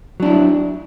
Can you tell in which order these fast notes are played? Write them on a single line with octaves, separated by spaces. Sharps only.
F#3 D4 E4